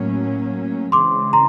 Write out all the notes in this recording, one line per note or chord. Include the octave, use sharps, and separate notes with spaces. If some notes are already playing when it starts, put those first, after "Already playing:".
Already playing: A2 F#3 A#3 C#4
C#3 E3 G#3 C4 C6 D6
A#5 C6